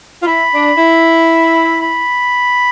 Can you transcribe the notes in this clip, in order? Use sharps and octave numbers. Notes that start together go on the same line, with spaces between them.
F4
E4 B5
D4
E4
B5